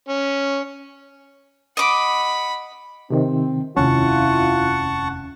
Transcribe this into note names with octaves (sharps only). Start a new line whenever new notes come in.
C#4
D#5 F#5 B5 D6
C3 D#3 C4
F1 D#2 C#4 E4 F4 F#5 A5 C#6